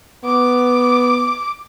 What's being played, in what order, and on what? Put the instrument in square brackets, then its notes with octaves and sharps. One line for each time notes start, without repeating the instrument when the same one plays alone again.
[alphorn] B3 [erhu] D6